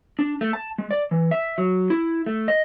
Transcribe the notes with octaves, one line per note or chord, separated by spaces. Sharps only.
D4
A3
A5
G#3
D5
E3
E5
F#3
E4
A3
D#5